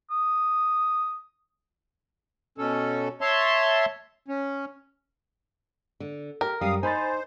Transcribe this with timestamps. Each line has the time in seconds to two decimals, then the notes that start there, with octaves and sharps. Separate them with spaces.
0.11 D#6
2.58 B2 C#4 A4
3.21 C#5 E5 A5 C6
4.28 C#4
6.00 D3
6.41 G4 A#4
6.61 F#2 F#3 G3 F5 D#6
6.83 D#4 C5 G#5 B5 A6